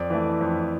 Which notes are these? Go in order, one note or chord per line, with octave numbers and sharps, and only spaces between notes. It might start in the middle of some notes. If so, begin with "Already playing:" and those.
Already playing: F2 D5
E3 A3
F2